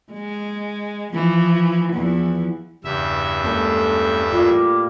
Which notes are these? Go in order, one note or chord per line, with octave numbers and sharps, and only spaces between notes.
G#3
E3 F3
E2 E3 F3
E2 G2 C#3 E5
G#3 A#3 C#4 A4
A2 G3 A#3 F4